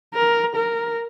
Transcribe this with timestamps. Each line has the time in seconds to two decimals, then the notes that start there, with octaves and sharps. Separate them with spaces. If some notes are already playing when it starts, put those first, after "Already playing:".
0.15 A#4
0.56 A#4